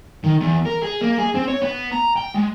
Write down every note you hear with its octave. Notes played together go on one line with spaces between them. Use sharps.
D#3
E2
A#4
G#4
A#3
G#4
C4
C#5
B3
A#5
G5
G#3